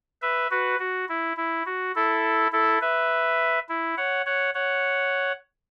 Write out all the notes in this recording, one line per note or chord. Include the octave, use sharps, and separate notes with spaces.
B4 E5
F#4 B4
F#4
E4
E4
F#4
E4 A4
E4 A4
B4 E5
E4
C#5 F#5
C#5 F#5
C#5 F#5